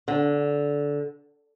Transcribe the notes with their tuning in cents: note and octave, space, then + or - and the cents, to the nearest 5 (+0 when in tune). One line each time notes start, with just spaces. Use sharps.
D3 -15